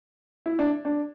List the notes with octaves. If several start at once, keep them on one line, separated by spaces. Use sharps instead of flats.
E4
D4
D4